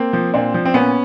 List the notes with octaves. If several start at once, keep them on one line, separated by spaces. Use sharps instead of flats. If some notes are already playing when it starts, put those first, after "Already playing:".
Already playing: A#3 C4
F3
A#2 C4 D4
F3
C4
A#2 B3 C#4